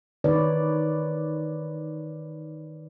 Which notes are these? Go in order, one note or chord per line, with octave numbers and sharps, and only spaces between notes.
D#3 E3 D#4 B4 C#5 D5